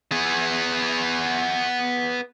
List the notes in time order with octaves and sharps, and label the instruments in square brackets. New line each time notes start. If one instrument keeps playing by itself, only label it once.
[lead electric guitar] B3 G#4